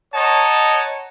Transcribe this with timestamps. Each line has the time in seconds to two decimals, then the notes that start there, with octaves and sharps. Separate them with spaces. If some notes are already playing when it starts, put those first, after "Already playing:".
0.14 C#5 D#5 F#5 A5 A#5